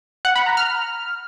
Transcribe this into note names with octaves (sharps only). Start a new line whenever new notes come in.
F#5
B5
A#5
F6